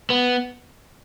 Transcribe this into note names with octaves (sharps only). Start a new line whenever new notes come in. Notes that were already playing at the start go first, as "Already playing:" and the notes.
B3